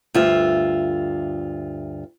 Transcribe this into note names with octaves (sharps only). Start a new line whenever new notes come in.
D2 G2 F4 E5